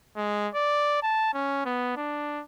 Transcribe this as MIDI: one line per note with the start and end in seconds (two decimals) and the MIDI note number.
0.17 0.48 56
0.55 0.99 74
1.02 1.32 81
1.34 1.65 61
1.65 1.96 59
1.97 2.42 62